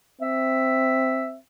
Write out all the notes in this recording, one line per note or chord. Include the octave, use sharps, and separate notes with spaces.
C4 E5